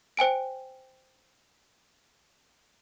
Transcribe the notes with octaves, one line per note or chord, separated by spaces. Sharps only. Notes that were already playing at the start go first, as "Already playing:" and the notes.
C5 G5 G#5 D7